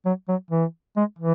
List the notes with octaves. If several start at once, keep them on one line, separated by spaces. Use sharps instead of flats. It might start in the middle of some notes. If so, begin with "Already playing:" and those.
F#3
F#3
E3
G#3
E3